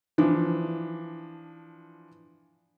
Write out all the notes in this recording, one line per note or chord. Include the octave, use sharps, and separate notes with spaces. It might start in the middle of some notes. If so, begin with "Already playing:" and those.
E3 F3 D4